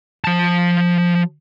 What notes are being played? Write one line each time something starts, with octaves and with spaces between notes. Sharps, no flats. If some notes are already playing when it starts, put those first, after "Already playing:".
F3 A5